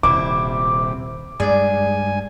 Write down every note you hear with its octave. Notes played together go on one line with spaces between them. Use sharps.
D#1 C3 E4 D6
G2 G#3 G#4 D5 G#5